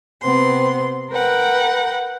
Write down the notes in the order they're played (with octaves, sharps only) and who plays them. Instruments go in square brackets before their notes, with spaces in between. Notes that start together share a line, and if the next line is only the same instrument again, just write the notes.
[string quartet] C3 B3 C4 C6
A#4 B4 F#5 G5